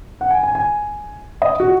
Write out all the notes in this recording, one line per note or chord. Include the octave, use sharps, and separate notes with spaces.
F#5
G#5
G#5
G#5
D#5
F#4